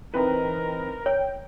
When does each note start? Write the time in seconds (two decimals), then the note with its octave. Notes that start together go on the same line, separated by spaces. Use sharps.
0.14 E3 C4 D#4 A#4 B4
1.06 C#5 G5